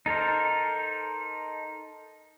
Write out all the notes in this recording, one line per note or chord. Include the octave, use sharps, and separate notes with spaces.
D#4 A4 A#4 C5